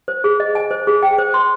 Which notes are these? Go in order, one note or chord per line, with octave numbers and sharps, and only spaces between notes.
C5
G#4
D#5
G#5
C5
G#4
G5
C5
C6